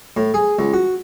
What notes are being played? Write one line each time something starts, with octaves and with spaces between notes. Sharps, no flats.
A2
G#4
C#2
F#4